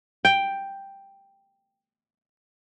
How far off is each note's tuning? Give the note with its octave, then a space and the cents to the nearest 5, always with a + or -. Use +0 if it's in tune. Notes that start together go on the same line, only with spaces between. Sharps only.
G5 +5